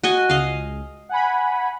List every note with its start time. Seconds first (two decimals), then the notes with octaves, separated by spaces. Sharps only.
0.03 F#4 D#5 G#5
0.30 C#2 D#5 F5
1.09 F#5 G#5 B5